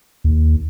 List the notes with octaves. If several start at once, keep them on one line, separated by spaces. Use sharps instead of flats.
D#2